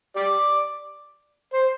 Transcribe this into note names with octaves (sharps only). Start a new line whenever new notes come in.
G4 D5
C5